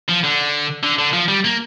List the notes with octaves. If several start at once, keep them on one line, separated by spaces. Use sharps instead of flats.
F3
D3
D3
D3
F3
G3
A#3